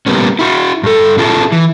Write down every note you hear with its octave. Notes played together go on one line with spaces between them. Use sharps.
G3 A#3 B3 C#4
E4 F#4
G2 A4
C#4 E4 F4 G#4 A4
E3